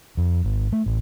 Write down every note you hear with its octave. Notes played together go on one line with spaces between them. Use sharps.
F2
G#1
A3
A1